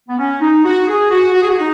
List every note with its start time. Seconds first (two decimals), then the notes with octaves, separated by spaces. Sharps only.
0.08 B3
0.18 C#4
0.41 D#4
0.64 F#4
0.87 G#4
1.11 F#4
1.34 F#4
1.42 G#4
1.48 F#4
1.58 D#4